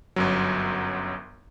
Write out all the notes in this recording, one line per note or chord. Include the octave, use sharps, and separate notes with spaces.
G1 F#2 F#3